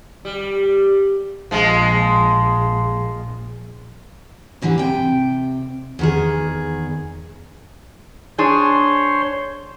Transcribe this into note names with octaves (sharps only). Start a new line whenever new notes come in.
G3
A#1 F3 G#3
G#2 D3 E3 G3
C3 G5
E2 D#3 G#4
D4 G#4 C5 C#5 C6